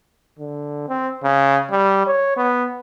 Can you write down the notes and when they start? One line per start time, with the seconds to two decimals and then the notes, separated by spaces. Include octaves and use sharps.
0.39 D3
0.88 C4
1.23 C#3
1.71 G3
2.07 C#5
2.37 B3